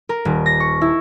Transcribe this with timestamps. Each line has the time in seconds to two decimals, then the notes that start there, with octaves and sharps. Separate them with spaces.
0.09 A#4
0.25 D#1
0.46 A#6
0.60 C#6
0.81 E4